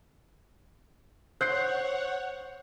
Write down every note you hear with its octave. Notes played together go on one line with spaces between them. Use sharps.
C5 C#5 F#5 F#6 G6 C7